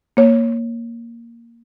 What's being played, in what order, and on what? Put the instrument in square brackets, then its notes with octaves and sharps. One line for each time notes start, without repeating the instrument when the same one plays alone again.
[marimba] A#3 C#5